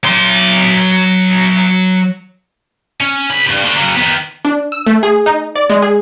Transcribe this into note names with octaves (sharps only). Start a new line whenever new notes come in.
F#3 C6
C#4
C2 B5
G2
A3 D4
C#3 F#3
D#3 B3
D4
E6
A3
G#4
D#4
D5
G#3
G#4